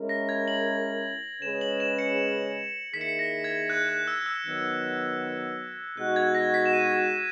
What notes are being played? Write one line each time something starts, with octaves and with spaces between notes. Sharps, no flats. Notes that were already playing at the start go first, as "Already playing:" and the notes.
Already playing: G#3 C#4 E4 A#4
A#6
G#6
F#7
C#3 G#3 C#4 G#4 B4 E7
F#7
E7
C#7
D#3 A#3 E4 G#4 B6
C#7
B6
A#6
G#6
F#6
F#6
E6
E6
D#3 F#3 B3
B2 G#3 D#4 F#4 F#6
G#6
A#6
B6
E7
D#7